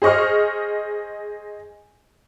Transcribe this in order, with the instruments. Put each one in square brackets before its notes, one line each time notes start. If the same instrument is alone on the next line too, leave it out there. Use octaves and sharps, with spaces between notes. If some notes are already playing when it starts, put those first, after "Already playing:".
[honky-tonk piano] G#4 C5 D#5 C#6 F6